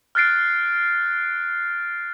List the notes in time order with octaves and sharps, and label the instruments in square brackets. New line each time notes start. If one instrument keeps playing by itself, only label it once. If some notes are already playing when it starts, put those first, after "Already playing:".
[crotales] F6 F#6 A6 C7 D7